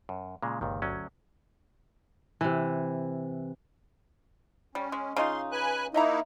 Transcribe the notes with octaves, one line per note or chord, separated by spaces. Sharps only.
F#2
A#2 C#3 G#3
G1 C#2 A#2 D#3
D2 F#3 C#4
C3 E3
G3 C#4
G#3
C#3 D#4 F4 C6
B4 G#5 F#6
A#3 D#4 E4 D#5 E5 A#5